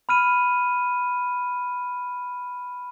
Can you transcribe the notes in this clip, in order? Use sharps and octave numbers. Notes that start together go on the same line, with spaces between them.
B5 F6 D#7